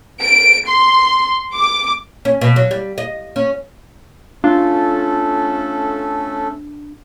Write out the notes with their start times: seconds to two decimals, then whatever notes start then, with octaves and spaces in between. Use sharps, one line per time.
0.22 D7
0.67 C6
1.54 D6
2.25 C#4
2.41 B2
2.56 F#3
2.71 G3
2.98 D#5
3.36 C#4
4.44 A3 C#4 D4 F4 A4